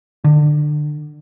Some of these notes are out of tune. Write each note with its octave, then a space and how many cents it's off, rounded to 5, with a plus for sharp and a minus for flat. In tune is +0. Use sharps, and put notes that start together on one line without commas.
D3 +25